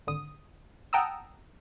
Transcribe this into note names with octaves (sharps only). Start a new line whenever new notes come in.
G#1 D3 D#6
F#5 G5 A5 A#5 D#6 E6